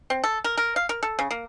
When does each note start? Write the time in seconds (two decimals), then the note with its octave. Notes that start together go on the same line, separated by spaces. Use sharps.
0.10 C4
0.24 A4
0.44 A#4
0.58 A#4
0.76 F5
0.89 A#4
1.03 A4
1.19 C#3
1.31 A#3